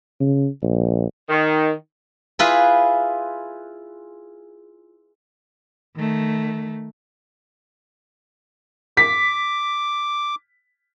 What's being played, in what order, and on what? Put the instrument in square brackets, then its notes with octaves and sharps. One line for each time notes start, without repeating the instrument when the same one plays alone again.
[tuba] C#3
A#1
[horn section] D#3
[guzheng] E4 F4 G#4 B4
[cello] D#3 A3
[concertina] D6 [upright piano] B6